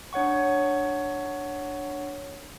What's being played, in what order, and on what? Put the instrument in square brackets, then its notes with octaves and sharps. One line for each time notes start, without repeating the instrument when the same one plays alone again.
[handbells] D4 C#5 F#5 C#6